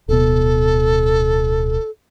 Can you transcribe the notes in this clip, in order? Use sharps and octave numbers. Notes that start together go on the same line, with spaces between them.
D1 B2 A4